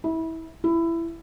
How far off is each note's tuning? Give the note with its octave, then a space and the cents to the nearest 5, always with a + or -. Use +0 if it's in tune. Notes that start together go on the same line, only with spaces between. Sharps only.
E4 -25
E4 +15